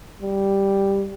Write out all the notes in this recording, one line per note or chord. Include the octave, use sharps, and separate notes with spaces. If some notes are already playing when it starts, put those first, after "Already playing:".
G3